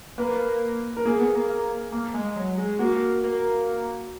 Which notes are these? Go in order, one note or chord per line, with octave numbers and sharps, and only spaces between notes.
A#3 B4
A#4
A#3 G#4
B3
A#3
A#3
A#3
G#3
F#3
G#3
A#3 F#4
A#3